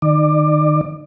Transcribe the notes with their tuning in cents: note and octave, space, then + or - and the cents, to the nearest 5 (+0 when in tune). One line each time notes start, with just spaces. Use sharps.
D#3 -25 D5 +25